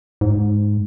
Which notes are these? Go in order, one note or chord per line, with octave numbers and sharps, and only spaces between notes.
G#2